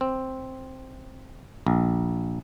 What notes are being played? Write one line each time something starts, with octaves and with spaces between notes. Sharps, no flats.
C4
A#1